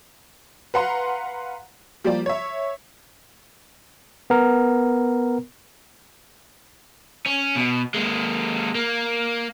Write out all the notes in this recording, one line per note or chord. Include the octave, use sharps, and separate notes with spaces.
B4 F5 F#5 A#5 C6
F3 G3 A#3 F4 G4 D5
C#5 E5
B3 A#4
C#4
B2
G#3 A#3
A#3